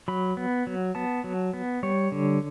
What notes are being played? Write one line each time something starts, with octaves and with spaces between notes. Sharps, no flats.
F#3 B5
B3
F#3
B3 A5
F#3
B3
G3 C#5
D3